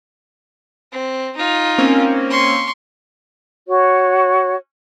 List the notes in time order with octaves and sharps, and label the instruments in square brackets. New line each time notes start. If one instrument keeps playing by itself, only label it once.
[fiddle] C4
D#4 F4
[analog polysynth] A#3 C4 C#4
[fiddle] C6 C#6
[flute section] F#4 C#5